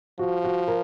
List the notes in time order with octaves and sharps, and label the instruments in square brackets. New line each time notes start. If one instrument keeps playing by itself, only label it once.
[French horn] F3 [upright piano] F#4
[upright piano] F#4
A#4